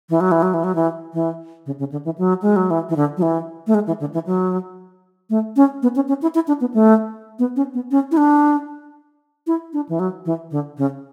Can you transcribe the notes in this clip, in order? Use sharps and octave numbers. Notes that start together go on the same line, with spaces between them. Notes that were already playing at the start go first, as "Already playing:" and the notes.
E3
F#3
E3
F#3
E3
F#3
E3
E3
C#3
C#3
D3
E3
F#3
G#3
F#3
E3
E3
D3
F#3
E3
A3
G#3
E3
D3
E3
F#3
A3
C#4
B3
C#4
C#4
E4
E4
D4
B3
A3
B3
C#4
B3
C#4
E4
D4
E4
D4
E3
F#3
E3
D3
C#3